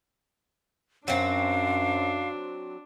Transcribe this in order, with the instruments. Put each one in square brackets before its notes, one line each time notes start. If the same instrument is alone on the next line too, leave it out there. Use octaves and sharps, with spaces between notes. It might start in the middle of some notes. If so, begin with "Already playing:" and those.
[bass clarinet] F#2 [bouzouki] F#3 C4 [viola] D4 [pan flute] F5